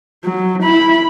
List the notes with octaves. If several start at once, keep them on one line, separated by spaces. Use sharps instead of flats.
F#3
E4 B5